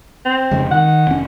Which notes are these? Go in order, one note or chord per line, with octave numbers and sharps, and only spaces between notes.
C4
F1 C#3 G#3
D#3 F#5
F1 C#4